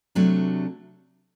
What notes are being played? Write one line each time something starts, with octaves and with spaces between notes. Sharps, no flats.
C3 F#3 A3 D4